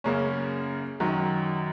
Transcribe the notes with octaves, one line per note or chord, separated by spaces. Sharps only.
F#2 C#3 A#3 C#4
F#2 D#3 F#3